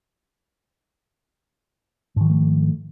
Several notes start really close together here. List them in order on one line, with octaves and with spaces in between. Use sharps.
G#2 D#3 F3 A3